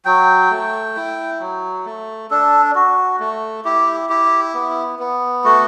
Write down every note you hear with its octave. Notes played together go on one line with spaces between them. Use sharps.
F#3 G5
A3
E4
F#3
A3
D4 A4
F#4
A3
E4 G4
E4 G4
B3
B3
A3 F#4